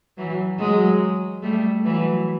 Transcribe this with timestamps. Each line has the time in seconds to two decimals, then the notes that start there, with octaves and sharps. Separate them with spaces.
0.18 E3 F#3
0.59 F#3 G#3
1.43 G3 A3
1.85 E3 F#3